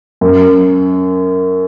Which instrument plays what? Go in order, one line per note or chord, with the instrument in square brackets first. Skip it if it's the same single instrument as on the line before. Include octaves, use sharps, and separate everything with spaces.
[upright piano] F#2